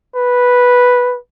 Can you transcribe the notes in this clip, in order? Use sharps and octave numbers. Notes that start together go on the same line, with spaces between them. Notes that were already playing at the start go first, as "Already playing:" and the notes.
B4